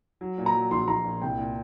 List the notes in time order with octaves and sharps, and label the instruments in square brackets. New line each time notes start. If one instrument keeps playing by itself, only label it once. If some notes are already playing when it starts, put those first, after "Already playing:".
[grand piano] F#3
A#2
[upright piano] A#5
[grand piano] F#3
[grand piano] A#1 [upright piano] C6
[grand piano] A#1 [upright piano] A#5
[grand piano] A#2
[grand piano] C2 [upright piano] G5
[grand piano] A#2